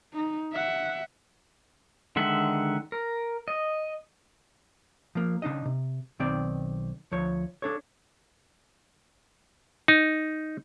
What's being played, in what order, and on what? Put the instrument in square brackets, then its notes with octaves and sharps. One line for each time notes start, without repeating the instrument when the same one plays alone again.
[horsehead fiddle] D#4
E5 F#5
[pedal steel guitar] D3 D#3 G#3 E5 F#5
A#4
D#5
[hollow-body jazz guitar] F3 A#3
C#3 D4 D#4 D#5
C3
B1 D#3 C4 D5
D2 F3 C#5
D4 A4 C#5
[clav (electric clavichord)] D#4